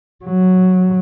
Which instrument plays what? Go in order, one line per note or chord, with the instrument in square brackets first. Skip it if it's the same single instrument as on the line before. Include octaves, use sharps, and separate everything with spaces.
[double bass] F#3